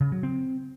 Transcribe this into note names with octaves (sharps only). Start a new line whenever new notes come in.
C#3
F#3
C4